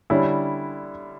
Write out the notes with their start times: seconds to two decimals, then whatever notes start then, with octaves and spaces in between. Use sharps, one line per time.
0.10 D3 G3 C#4 E4